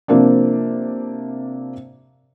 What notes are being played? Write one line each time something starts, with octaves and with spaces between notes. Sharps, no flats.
C3 F3 A#3 C4 D4